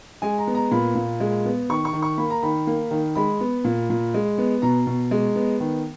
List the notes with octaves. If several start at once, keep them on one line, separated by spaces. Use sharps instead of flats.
G#3 G#5
A#5
B3
A#5
A#2 B5
A#2
G#3
B3
D#3 C#6
C#6
D#3
C#6
A#3 B5
A#5
D#3 B5
A#3
D#3
G#3 B5
B3
A#2
A#2
G#3
B3
B2 A#5
B2
G#3
B3
D#3